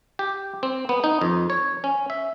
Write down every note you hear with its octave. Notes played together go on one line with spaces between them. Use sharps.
G4
C4
B3
D#4
F2
C#5
C#4
E5